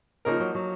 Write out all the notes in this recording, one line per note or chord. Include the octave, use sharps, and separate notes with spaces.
C#3 F3 A#3 D#4 A#4
F#3
F#3